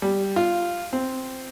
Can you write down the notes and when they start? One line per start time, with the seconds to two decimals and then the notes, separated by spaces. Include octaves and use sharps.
0.02 G3
0.36 F4
0.93 C4